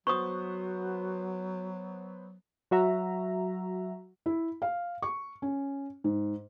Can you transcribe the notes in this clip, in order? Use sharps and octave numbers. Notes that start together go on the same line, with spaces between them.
F#3 B3 F#4 C5 C#6 D#6
F#3 F#4 E5 A#5
E4
F5
C#6
C#4
G#2